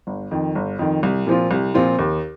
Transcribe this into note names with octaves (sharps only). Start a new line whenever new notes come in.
G1
F2 D#3
G1
F2 D#3
C2
A#2 F3 C4 F4
C2
A#2 F3 C4 F4
D#2